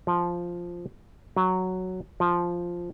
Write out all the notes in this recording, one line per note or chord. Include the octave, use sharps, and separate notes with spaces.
F3
F#3
F3